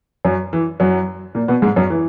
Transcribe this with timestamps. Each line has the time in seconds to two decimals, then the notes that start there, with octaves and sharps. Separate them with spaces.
0.25 F#2 F#3
0.53 E3
0.80 F#2 F#3
1.35 A#2 A#3
1.48 B2 B3
1.62 G#2 G#3
1.76 F#2 F#3
1.90 E3